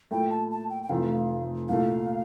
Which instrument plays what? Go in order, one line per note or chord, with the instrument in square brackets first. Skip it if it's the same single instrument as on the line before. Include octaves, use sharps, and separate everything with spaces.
[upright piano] A#2 A3 E4 [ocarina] G5
[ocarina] A5
A5
G5
G5
[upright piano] F1 F2 E3 A3 [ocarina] F5
[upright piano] C2 A#2 A3 [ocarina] F5